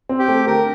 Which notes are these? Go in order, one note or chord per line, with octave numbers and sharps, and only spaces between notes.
C4
G4
A3
D3 A#4